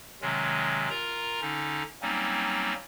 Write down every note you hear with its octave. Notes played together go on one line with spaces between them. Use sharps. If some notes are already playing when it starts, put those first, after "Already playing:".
C3 D#3 F#3 G#3 C#4
F4 A#4 A#5
D3 C#4 D#4
F#3 G3 A#3 C4 C#4 D#4